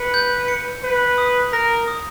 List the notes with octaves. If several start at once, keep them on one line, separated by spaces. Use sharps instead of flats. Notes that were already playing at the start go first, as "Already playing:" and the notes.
Already playing: B4 C#7
G6
C#7
B4 G6
D#6
A#4 A#6
D#6